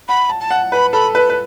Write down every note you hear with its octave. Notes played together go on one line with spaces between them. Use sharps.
F#5 B5
A5
A5
F#5
B4 B5
A4 B5
B4
B4